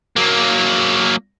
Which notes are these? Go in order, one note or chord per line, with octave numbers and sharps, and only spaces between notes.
F#3 A#3